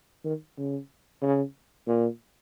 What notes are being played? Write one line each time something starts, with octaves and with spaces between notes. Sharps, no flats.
D#3
C#3
C#3
A#2